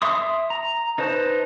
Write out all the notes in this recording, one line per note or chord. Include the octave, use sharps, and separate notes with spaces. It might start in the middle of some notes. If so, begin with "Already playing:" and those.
E5 C6 D#6
A#5
D#4 B4 C5 A5